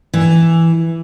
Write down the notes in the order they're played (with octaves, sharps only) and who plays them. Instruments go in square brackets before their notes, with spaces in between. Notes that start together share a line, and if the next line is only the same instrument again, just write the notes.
[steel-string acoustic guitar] E3